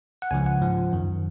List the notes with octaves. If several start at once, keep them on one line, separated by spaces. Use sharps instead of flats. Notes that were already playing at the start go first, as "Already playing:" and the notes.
F#5
C#2 C#3 F3 G#5
F#5
G#2 F3
F#2 D#3